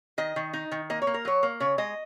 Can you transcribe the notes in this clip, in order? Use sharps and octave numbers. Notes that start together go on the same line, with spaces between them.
D#3 D#5
D#3
D#4
D#3
A#3 D#5
C#5
A#3
A#4
F#3 C#5
A#3
C#3 C#5
G#3 D#5